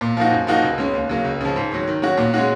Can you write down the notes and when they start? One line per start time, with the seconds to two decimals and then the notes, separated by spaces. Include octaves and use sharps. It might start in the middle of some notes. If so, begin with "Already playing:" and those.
0.01 A#2
0.17 F3 A#3 D#4 F#4
0.31 F#2
0.47 F3 A#3 D#4 F#4
0.63 C#2
0.78 C#3 G#3 C#4
0.94 D#2
1.09 C#3 F#3 A#3
1.25 C#2
1.41 C#3 F3
1.56 G#2
1.71 D#3 F#3
1.87 D#3
2.02 F#3 C#4 F#4
2.17 A#2
2.34 G#3 C#4 F#4